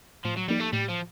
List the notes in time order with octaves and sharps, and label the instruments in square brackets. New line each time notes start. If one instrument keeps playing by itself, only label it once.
[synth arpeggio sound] A2 [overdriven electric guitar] F3
[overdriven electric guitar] F#3
[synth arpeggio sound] F3 A#3 D#4 G4 [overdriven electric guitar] G3
[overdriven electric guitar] A3
[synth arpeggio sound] A2 [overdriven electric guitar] G3
[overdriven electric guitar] F3